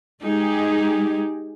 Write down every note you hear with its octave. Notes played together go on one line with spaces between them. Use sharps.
G#3 D#4 G4 G#4